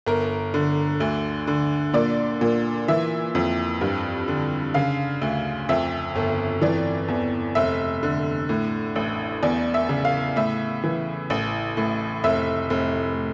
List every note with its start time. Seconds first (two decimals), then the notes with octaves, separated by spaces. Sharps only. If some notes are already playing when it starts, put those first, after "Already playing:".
0.07 G1 A#4
0.54 D3
1.00 D2
1.47 D3
1.94 A#2 D5
2.41 A#2
2.88 E3 E5
3.35 F2
3.81 G2
4.28 D3
4.74 C#3 F5
5.22 D2
5.69 F2 E5
6.16 G1
6.61 E3 D5
7.08 E2
7.55 F1 E5
8.03 D3
8.49 A2
8.96 A1
9.43 E2 D5
9.74 E5
9.89 C#3
10.05 F5
10.36 A2 E5
10.84 E3
11.30 A1
11.77 A2
12.24 F1 E5
12.70 F1